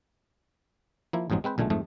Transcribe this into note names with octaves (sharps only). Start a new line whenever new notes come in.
F3 A#3 E4
A1 F2 G#2 F#3 G#3
G#3 C4 B4 C5
B1 A#2 D3 G#3 A3
F2 G#2 A3